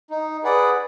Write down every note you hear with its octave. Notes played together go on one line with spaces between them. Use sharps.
D#4
G#4 B4 D5 F#5